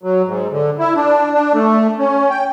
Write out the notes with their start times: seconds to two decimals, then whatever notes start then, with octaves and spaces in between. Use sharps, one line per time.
0.03 F#3
0.26 G#2
0.51 D3
0.79 E4
0.95 D4
1.34 D4
1.54 A3
1.99 C#4
2.30 G5